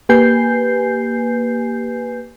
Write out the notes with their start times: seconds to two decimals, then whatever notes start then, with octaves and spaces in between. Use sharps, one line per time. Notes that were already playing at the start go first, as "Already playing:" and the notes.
0.09 A#3 G4 B4 G#5 G6 C7